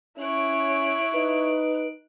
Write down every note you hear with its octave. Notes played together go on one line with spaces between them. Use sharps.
C#4 E4 C#5 F#6 D7
D#4 B4